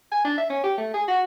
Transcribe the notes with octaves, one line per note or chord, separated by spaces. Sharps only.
G#5
D4
E5
C#4
G4
A3
G#4
F#4